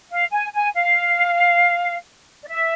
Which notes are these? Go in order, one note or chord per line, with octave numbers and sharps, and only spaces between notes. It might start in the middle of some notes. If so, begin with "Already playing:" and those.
F5
G#5
G#5
F5
D5
E5